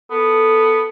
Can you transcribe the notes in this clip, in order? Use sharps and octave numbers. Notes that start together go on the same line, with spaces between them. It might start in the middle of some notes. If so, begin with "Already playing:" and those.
B3 A4